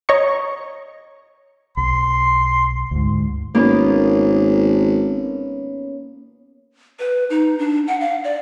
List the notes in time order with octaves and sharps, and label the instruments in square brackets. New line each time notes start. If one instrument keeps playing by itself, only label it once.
[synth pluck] C#5 D#5 A#5 C#6
[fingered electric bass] B1 [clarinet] C6
[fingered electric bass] D2 G#2
[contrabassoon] G#1 [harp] A#3 B3 C#4
[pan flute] B4
D#4
D4
F#5
F5
D5